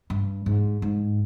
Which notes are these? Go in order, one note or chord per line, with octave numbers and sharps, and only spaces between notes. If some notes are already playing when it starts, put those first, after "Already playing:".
G2
G#2
G#2